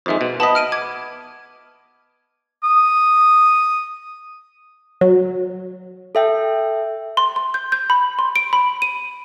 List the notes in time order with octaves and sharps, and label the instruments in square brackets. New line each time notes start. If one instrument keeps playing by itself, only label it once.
[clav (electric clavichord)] F2 D#3 G#3 [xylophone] C5 E5
[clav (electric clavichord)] B2
[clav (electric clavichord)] B3 D#5 [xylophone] A5 B5 B6
[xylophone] F6 D7 D#7
D6 G#6
[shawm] D#6
[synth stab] F#3
[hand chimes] A4 E5 G5
[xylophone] C6
C6
G6
G6
B5
C6
D7
B5
D#7